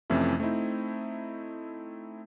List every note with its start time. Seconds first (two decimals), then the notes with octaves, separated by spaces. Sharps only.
0.10 F2 C3 E3 A3 C#4 E4
0.40 A3 C4 D#4 E4